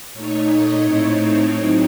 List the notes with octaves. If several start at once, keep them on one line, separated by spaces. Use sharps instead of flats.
A#2 A3 D#4 C#5
D#5
A2 A3 C4 D#4 C#5
A2 F#3 C4 D#4